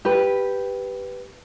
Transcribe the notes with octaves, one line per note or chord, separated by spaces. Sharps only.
G4 B4